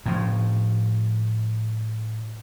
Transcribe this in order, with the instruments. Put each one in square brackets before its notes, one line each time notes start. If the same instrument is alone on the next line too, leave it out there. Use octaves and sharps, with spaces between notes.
[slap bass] A2 F3